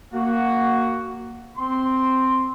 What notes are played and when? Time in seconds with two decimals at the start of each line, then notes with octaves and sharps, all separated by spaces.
0.14 A#3 F#4
1.57 C4 C6